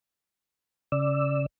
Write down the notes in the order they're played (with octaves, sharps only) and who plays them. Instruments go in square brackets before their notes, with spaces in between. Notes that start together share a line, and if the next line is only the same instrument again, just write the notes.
[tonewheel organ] C#3 D5 E6